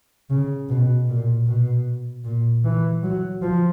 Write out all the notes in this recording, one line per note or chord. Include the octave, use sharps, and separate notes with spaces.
C#3
B2
A#2
B2
A#2
E3
F#3
F3